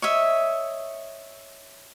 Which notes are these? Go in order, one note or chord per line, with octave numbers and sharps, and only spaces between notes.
C#5 D#5 E5